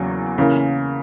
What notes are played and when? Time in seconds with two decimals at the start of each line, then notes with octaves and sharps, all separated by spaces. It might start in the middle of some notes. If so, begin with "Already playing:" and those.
Already playing: E2 C#3 F#3 A#3
0.38 C#3 E3 A#3